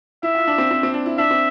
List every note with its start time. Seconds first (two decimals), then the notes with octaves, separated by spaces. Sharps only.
0.23 E4 E5
0.35 F4
0.47 D4
0.58 C4
0.71 C4
0.83 C4
0.94 D4
1.06 E4
1.18 D4 E5
1.31 C4